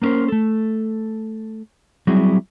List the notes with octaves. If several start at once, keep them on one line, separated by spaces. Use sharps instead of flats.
A#3 B3 C#4 A#4 C5
A3 A4
F#3 G3 C4 E4 F#4 G#4